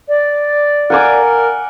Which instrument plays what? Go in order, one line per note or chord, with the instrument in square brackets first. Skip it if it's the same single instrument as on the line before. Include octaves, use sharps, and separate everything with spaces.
[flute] D5
[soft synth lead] A#4 [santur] F#5 G#5 D6